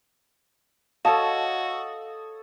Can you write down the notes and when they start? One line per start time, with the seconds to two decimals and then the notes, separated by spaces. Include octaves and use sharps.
1.05 F#4 A4 C#5 D#5 F5 A5